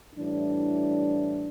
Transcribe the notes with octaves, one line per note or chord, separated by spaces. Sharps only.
A2 E3 G3 D4